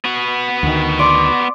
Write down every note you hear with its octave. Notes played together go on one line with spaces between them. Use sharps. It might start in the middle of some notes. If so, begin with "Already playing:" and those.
B3 F#4
D2 D#3
D5 C6